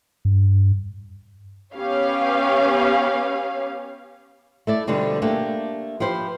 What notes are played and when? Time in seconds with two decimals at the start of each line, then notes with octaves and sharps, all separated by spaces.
0.25 G2
1.76 B3 C#4 G4 C#5 F5
4.67 A3 E4 D5
4.87 B2 D3 F3 G3 C4
5.22 A3 A#3 D4 G4
6.00 F3 G4 B4 C5